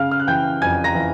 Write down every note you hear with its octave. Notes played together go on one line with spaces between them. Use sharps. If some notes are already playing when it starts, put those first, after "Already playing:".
Already playing: C#3 F5 F6
F6
F#6
E3 G5 G6
F2 G#5 G#6
A#5 A#6
E3